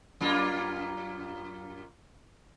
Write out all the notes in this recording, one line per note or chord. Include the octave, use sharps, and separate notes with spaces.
F#2 A#3 F4